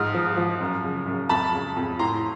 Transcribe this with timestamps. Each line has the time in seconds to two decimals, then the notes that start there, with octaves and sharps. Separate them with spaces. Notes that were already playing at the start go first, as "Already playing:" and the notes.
Already playing: G#2 F3 D#6 F6
0.14 F3
0.37 F3
0.61 F#2
0.83 C#3
1.07 F#2
1.29 F2 A5 B5
1.54 C#3
1.77 F2
1.99 A2 A#5 C6